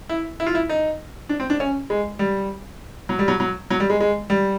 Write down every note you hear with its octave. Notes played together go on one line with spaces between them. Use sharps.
E4
E4
F4
E4
D#4
D4
C4
D4
C#4
G#3
G3
F#3
G3
F#3
F#3
F#3
G3
G#3
G#3
G3